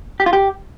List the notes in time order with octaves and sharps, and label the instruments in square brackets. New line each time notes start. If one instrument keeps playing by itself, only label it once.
[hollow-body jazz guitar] G4
F4
G4